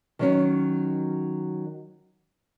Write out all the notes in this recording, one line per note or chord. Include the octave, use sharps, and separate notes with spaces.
D#3 F#3 C#4